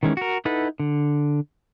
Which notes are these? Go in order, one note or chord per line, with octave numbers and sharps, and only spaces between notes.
D#3 E3 G#3 C#4
F#4 A#4
D#4 E4 A4 B4 F#5
D3